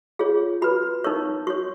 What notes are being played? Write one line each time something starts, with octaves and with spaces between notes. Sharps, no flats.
F4 G#4 C#5
F#4 B4 B5
D#4 A#4 C#5 C#6
F#4 C#5 C#6